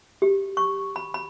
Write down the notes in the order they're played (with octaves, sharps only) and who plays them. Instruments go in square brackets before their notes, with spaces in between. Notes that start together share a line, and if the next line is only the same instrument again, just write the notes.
[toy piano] G4
C#6
B5
B5